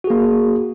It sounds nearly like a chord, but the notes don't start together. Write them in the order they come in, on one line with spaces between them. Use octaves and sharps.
F#4 G#4 A#3